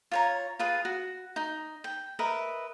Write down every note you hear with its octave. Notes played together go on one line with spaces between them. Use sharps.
F4 C#5 A#5
F4 G#4 B4
F#4
D#4
G5
A#4 B4 D#5 E5